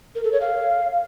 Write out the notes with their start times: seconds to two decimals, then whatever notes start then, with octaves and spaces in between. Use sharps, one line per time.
0.15 A#4
0.24 A4
0.32 C#5
0.41 F5